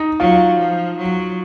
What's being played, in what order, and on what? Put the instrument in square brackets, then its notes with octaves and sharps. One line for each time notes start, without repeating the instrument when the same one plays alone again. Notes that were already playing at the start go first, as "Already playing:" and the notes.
Already playing: [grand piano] D#4
[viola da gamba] F#3 [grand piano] F4
[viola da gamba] F3
F#3